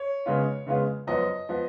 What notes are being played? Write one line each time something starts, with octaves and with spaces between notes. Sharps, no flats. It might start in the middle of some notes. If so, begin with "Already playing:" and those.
Already playing: C#5
C#3 G#3 B3 F4
C#3 G#3 B3 F4
F#2 F3 B3 D#5
F3 B3